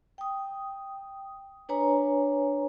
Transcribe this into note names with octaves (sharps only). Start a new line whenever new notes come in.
G5 D#6
D4 B4 C#5 G#5 A#5